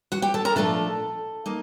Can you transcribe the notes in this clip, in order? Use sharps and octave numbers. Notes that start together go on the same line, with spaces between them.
F#4 F#5
G4 G5
A4 A5
A#4 A#5
A#2 F3 A3 D4 A4 A5
A#3 D#4